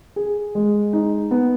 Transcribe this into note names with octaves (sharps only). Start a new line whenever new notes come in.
G#4
G#3
D#4
B3